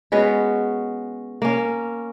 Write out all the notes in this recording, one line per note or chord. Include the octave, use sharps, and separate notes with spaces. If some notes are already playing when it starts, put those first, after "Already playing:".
G#3 B3 C#4 F#4
A#3 C#4